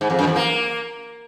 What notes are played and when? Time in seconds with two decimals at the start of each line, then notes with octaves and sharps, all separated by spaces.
0.01 G#2
0.10 F2
0.19 F#2
0.27 E2
0.36 A#3